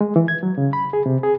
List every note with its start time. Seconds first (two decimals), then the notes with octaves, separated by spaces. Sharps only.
0.01 G#3
0.16 E3
0.28 G#6
0.43 F#3
0.58 C#3
0.73 B5
0.93 G#4
1.06 C3
1.23 G#4